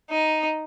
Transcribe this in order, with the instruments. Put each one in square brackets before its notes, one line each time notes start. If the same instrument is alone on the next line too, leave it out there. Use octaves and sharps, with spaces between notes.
[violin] D#4